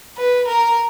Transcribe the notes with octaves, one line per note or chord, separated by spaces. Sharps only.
B4
A#4